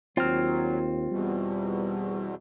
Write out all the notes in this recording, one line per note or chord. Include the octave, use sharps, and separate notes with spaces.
D#2 F#3 C4 F4 F6
E2 B2 G3